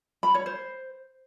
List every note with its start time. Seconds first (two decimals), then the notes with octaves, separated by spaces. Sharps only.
0.23 B5
0.34 C#5
0.46 C5